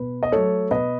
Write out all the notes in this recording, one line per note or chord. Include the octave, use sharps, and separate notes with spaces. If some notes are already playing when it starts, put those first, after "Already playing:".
Already playing: B2 B4
D#5
F#3 A3 A4 C#5
B2 B4 D#5